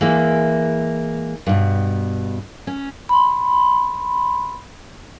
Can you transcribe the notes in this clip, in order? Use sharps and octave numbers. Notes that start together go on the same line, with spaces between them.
E3 G#3 A#3
G2 B2
C#4
B5 C6